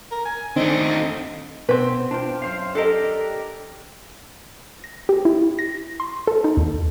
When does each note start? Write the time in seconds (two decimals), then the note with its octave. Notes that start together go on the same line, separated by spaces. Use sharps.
0.12 A#4
0.26 G#5
0.56 D#3 A3 C4 D4 D#4 D#5
1.69 B2 C4 B4
2.11 D4 F4 G5
2.42 F#2 C5 F5
2.75 D4 G4 A4 A#4 D#5
4.84 A#6
5.09 G4
5.25 E4
5.59 A#6
6.00 C6
6.27 A4
6.44 D#4
6.57 D#2